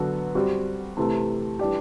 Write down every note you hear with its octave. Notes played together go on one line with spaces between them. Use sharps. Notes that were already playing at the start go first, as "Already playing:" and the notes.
Already playing: D3 F#3 B3 F#4 A4
G3 C4 F#4
C3 E3 A3
E3 G3 D4 G4